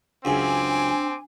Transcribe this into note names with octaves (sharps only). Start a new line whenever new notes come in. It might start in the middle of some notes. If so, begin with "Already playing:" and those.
C#2 F#2 C#3 C4 D4 G#5 D6